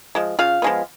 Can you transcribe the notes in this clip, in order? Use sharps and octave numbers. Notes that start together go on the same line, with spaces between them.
F3 G#3
C#3 F4 F5
F3 G#3 B3